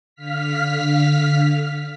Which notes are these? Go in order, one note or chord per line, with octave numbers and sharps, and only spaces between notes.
D3 F5 F6 B6